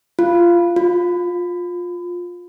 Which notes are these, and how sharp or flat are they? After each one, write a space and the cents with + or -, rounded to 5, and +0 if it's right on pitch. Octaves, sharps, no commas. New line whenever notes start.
F4 -15
F4 +20